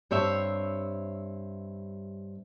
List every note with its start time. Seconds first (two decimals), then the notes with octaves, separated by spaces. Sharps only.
0.11 G2 C4 C#5 E5